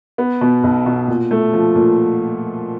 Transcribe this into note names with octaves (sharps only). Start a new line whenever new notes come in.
B3
B2
B1
B2
A#2
A3
F3
A#2